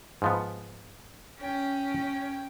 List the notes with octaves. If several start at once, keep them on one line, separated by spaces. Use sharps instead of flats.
G#2 F3 B3
C#4 G5